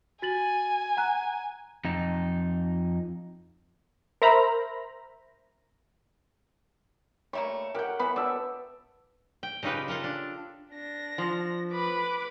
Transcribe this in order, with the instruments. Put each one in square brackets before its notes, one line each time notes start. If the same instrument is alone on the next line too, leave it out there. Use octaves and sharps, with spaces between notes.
[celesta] F#4 A6 F#7 [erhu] G#5
[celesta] F#5 A#5 F#6
[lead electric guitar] F2 D#4
[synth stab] A#4 C5 E5 A#5 B5
[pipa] G3 A3 A#3 [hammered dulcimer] C#5
[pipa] G4 G5 [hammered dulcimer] A#4 F#5
[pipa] E3 B4 B5 [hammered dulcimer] B3
[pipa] G3 [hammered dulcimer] D5 E5 A5
[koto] G5
C#3 D#4 F4 G4 B4
F4 A4 A#4 E5
D4
[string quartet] D4 A#6
[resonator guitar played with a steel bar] F3
[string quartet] B4 B5 D6